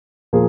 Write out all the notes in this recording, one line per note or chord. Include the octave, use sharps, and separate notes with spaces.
A#2 F3 A#3 G#4